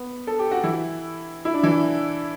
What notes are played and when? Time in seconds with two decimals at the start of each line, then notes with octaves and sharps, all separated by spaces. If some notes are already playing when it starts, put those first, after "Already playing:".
Already playing: B3
0.27 A4
0.39 G4
0.51 F#4
0.63 E3 E4
1.45 E4
1.54 D4
1.63 E3 E4